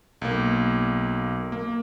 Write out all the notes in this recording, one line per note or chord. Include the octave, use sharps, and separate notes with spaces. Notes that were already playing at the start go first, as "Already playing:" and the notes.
B1 A#3
A#3